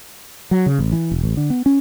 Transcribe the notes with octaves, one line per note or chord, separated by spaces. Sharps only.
F#3
C#3
A1
E3
E1
A1
D3
B3
C#4